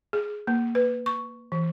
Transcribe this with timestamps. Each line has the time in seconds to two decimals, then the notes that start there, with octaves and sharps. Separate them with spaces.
0.13 G#4
0.47 A#3
0.75 B4
1.06 C#6
1.52 E3